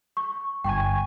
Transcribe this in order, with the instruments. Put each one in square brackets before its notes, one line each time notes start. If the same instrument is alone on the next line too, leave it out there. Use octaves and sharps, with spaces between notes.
[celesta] C#6
[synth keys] G1 G#5 [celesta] G5 C#6